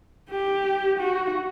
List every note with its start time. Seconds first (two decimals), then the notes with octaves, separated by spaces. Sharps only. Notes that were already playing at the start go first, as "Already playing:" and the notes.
0.30 G4
0.99 F#4